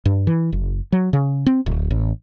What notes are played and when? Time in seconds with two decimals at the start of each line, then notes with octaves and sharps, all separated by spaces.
0.05 G2
0.27 E3
0.53 F#1
0.92 F#3
1.13 C#3
1.46 C4
1.66 D1
1.91 A1